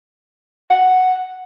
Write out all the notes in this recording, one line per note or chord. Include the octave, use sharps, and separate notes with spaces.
F#5